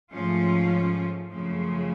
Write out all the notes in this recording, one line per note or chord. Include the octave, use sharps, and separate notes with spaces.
G#2 F3 A3 C#4 F4
F#2 C#3 F3 A3